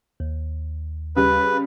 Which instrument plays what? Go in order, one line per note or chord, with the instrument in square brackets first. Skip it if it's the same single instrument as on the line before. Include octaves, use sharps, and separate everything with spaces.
[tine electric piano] D#2
[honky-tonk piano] C#3 G3 [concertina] B4